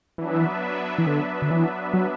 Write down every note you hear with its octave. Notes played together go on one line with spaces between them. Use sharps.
E3 F#3 B3 D4 B4 E5
E3
D3
D3
E3
F#3